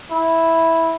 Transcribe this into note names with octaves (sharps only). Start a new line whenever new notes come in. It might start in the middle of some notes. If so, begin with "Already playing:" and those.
E4